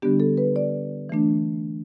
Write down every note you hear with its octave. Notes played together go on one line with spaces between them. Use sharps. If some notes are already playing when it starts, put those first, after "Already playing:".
D3 G3 B3 D4 G4
A4
B4
D5
E3 A3 D4